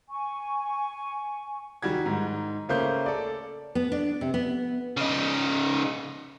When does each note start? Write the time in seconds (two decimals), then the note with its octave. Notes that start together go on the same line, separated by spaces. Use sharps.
0.09 G#5 C#6
1.82 D#3 G3 F#4 G#6
2.06 G#2 D#3
2.69 C#3 A3 A#3 C#4 C5 G6
3.06 A4 D5
3.75 B3
3.92 D4
4.21 C3
4.34 B3
4.97 C#3 D#4